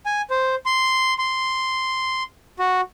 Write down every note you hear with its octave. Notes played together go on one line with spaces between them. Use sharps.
G#5
C5
C6
C6
F#4